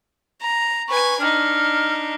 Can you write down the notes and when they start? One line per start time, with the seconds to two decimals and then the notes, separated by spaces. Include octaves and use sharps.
0.41 A#5
0.88 B4 G#5 C#6
1.20 D4 D#4 F6